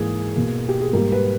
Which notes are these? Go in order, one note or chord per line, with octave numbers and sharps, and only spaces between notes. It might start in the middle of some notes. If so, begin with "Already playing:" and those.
Already playing: G#2 E3 A#3 G#4
B2 A#3
G4
G#4
G#2 G3 A#3 A#4
B4